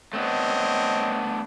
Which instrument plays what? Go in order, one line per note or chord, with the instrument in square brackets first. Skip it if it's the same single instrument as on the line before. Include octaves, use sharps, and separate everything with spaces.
[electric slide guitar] A3 B3 D4 [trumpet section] C4 C#5 D#5